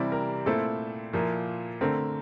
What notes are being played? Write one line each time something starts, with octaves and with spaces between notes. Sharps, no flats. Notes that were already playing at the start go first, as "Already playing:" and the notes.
Already playing: C3 E3 G3 C4 E4 D5
A#4
A#2 A3 C4 E4 A4
A#2 F3 A#3 E4
D3 A3 C4 A#4